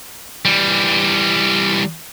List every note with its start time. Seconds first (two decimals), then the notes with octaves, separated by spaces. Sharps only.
0.45 E3 G3